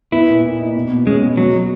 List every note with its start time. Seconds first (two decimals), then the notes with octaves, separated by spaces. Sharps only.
0.12 B3 E4
0.27 A#2
0.43 A#2
0.59 D#4
0.75 B2
0.90 B2
1.06 G#3 C#4
1.22 B2
1.37 B2 F#3